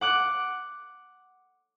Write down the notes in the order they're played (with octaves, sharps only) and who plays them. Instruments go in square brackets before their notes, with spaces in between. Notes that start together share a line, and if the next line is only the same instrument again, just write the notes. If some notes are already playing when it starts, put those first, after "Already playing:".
[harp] F#5 D6 F#6